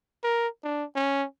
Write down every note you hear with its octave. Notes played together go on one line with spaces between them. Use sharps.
A#4
D4
C#4